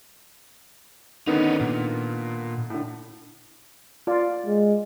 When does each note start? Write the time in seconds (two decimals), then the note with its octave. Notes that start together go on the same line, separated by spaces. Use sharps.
1.27 D3 D#3 B3 C#4 D#4
1.61 A#2
2.70 A2 D3
4.07 F4 D5
4.47 G#3